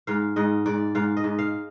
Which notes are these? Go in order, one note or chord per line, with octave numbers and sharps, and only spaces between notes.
G#2 F5
G#2 D#5
G#2 D5
G#2 F5
D#5
G#2
F5